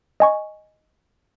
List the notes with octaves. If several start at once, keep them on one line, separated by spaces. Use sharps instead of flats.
D#5 G#5 C#6